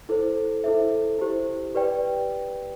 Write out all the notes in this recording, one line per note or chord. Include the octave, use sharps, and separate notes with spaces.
E4 A4 C5
E4 A4 C5 E5
E4 G4 C5
G4 B4 D5 G5